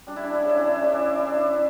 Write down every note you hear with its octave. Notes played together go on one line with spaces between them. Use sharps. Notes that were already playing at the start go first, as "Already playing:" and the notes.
G3 D4
E4
D4
E4
C#3 D4
E4
D4
E4
D4
C#3 E4
D4
E4
D4
E3 E4
D4
E4
C#4 D4